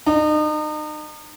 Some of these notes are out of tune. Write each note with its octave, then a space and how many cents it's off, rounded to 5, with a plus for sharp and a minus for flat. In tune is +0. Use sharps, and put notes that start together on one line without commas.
D#4 -35